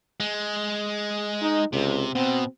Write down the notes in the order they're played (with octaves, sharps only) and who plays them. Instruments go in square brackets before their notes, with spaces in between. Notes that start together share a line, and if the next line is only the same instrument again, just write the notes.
[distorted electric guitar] G#3
[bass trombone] D#4
[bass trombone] C#2 [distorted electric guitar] C3
[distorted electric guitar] B2 [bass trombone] C4